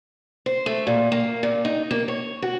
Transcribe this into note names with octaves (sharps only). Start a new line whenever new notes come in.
C5
A3
A#2
A#3
A#2
D#4
A#3
C#5
F#4